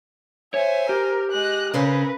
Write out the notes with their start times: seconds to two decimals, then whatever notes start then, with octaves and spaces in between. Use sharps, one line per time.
0.54 C5 C#5 E5 G#5
0.89 G4 A#4
1.31 G#3 D#5 F#6
1.74 C#3 C4 C#4 A#4 B4